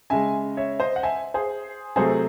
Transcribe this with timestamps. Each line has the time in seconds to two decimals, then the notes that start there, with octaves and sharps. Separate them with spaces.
0.10 C#3 G#3 E5 G#5
0.57 C#5 E5
0.80 C5 D#5
0.96 F#5
1.03 E5 G#5
1.34 G#4 C5
1.96 C3 F#3 A3 G#4 C5